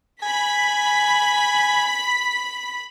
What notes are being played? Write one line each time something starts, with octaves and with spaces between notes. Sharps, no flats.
G#5 B5 B6